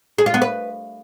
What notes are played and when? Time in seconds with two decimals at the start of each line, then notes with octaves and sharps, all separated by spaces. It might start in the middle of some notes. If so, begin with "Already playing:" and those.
0.18 G#4
0.26 F4
0.34 B3
0.42 B4